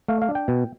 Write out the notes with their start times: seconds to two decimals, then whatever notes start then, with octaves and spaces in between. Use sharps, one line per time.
0.08 A3 F5
0.22 F5
0.29 D4
0.35 G5
0.48 B2